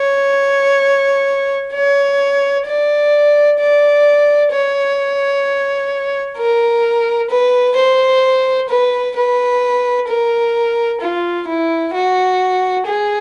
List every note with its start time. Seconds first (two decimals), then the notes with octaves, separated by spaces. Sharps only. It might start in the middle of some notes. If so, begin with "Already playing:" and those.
Already playing: C#5
1.74 C#5
2.67 D5
3.59 D5
4.52 C#5
6.37 A#4
7.30 B4
7.76 C5
8.69 B4
9.16 B4
10.08 A#4
11.01 F4
11.47 E4
11.94 F#4
12.86 G#4